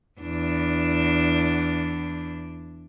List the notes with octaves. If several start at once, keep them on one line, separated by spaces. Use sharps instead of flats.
E2 D4